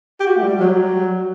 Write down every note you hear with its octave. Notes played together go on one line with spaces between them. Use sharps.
G4
F#4
A3
G3
F#3